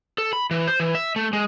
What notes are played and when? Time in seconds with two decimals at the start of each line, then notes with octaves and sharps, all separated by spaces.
0.18 A4
0.33 B5
0.51 E3
0.67 C5
0.80 E3
0.95 E5
1.16 A3
1.33 G#3